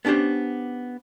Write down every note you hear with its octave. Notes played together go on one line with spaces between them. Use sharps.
B3 C#4 D4 G4 C5